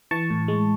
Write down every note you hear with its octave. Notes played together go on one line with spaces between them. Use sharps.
E3 A5 C#6
A2
G#3